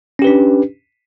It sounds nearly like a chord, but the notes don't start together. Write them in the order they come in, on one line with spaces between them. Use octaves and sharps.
C#4 G4 B4 D4